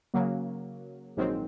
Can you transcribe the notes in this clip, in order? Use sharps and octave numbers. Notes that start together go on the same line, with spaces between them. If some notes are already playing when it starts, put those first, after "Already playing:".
C#3 F#3 A#3
A#1 G#2 D#3 F#3 C4